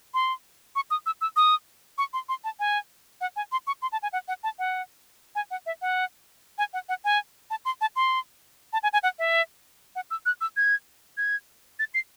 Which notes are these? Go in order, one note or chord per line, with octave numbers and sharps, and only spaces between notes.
C6
C#6
D#6
E6
E6
D#6
C#6
C6
C6
A5
G#5
F#5
G#5
C6
C#6
C6
A5
G#5
F#5
F#5
A5
F#5
G#5
F#5
E5
F#5
G#5
F#5
F#5
G#5
A5
C6
A5
C6
A5
G#5
G#5
F#5
E5
F#5
E6
F#6
E6
G#6
G#6
A6
C7